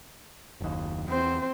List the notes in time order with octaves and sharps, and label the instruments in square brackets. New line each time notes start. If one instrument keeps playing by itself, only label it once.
[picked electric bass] F#1 D#2
[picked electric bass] E2 [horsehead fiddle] C4 C5